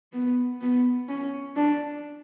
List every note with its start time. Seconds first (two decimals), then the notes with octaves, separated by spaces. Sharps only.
0.13 B3
0.61 B3
1.09 C#4
1.56 D4